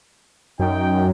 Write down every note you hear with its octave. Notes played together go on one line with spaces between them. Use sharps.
F#2 C#4 D#4 G5